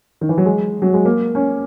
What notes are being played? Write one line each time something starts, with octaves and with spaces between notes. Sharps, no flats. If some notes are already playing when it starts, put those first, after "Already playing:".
D#3
E3
F#3
G#3
F#3
G#3
A#3
C#4